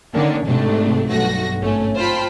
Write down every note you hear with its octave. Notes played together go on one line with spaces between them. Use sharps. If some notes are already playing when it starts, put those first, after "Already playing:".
D3 D#3 A#3 C#4 D4
G#2 C3 A3 D4
B1 G2 A3 F#4 A#6
G#1 A3 C#4
F4 C5 G5 A5 B5